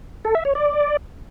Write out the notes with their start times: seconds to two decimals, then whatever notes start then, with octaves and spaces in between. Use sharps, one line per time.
0.25 A4
0.35 E5
0.45 C#5
0.55 D5